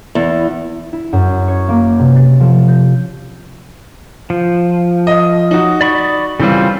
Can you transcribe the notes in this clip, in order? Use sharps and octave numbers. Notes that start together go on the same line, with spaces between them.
E2
E4
F#2
C#5
A#3
C3
A6
F3
G6
F3
D#5
D#4 F#4
D5 B5 C#6
C#3 E3 G3 C4 F4